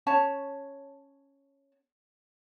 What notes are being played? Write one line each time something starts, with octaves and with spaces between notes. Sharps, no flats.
C#4 C#5 A5